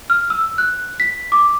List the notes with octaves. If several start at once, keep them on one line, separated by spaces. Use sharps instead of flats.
F6
E6
F#6
B6
D6